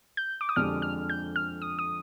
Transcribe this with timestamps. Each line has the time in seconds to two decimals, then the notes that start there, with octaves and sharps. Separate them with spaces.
0.17 G6
0.41 D6
0.49 D#6
0.56 F2 D3 G#3 D4 G4 F6
0.82 F6
1.10 G6
1.36 F6
1.62 D#6
1.79 D#6